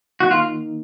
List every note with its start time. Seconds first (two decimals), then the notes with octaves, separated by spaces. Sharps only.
0.20 D#3 A#3 D#4 F#4
0.31 F4